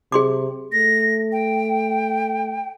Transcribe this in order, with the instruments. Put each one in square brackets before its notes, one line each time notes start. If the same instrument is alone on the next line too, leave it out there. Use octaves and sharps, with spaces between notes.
[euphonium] C3 [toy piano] G#4 C6 D6
[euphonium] A3 [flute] A#6
[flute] G5